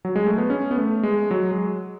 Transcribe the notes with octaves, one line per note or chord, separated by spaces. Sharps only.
F#3
G#3
A3
B3
C#4
B3
A3
G#3
F#3
G#3